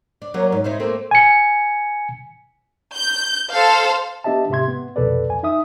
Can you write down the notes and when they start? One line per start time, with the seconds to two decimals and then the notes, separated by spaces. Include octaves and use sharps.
0.22 D4
0.34 F#3 A#3 C#4
0.52 G#2
0.64 C4 D#4 E4
0.80 A3 A#3 C4
1.11 G#5 C#7
2.96 G6
3.53 A4 C5 F5
4.24 B3 D4 G4 D#5 E5 A5
4.50 G#2 C3 G4 E5 C6 G#6
4.68 B3
4.96 C2 F2 B2 A4 B4 D5
5.28 F2 G#5
5.43 D#4 E5 D#6